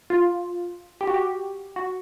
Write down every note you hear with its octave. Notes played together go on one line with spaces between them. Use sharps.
F4
G4
F#4
G4
F#4